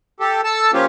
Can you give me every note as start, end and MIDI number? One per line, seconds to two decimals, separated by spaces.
0.20 0.41 67
0.20 0.41 69
0.44 0.71 69
0.44 0.71 81
0.44 0.71 88
0.73 0.86 53
0.73 0.86 58
0.73 0.86 61
0.73 0.86 65
0.73 0.86 67